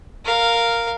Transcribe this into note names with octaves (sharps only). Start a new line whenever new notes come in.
A#4 F5